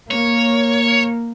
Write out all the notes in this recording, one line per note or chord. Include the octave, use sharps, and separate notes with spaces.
A#3 C#5